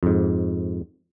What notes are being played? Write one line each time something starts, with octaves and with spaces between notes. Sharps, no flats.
F2 G#2